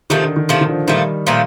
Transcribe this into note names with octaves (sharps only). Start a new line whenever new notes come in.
C3 D#3 F3 A3
D3
D#3
C3 F3 A3
D#3
D3 F3
A#2 D#3 F3 G3 A3
A#2 F3 A3